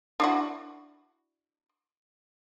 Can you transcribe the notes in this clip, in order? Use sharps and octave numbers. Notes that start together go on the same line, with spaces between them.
D4 E4 F#4